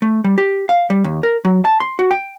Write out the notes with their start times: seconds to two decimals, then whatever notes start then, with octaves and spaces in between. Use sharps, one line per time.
0.02 A3
0.24 G3
0.38 G4
0.69 F5
0.90 G3
1.04 D#2
1.23 A#4
1.45 F#3
1.65 A5
1.80 C6
1.99 F#4
2.11 G5